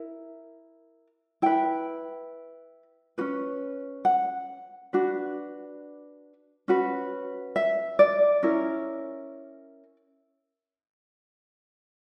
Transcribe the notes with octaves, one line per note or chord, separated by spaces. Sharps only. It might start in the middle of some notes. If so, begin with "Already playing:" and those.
Already playing: E4 A#4
E4 B4 G5
C#4 F#4 B4
F#5
D4 F#4 B4
C#4 F#4 B4
E5
D5
C#4 E4 A#4